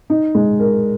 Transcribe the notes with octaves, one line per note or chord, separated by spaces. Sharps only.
D#4
G#3
A#4